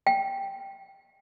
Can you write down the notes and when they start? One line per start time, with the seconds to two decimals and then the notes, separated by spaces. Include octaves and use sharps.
0.07 G5